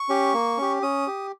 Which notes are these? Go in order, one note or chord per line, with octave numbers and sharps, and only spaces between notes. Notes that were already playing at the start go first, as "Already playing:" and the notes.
Already playing: C#6
C#4 G4
A#3
C#4 G4
C#4 D#6
G4